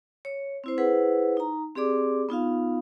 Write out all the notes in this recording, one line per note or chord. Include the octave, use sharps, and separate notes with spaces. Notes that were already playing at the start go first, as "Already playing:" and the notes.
C#5
C4 E4 C5
E4 G#4 B4 C5 F#5
D#4 A#5
C4 G4 G#4 D5 D6
B3 D#4 F4 F5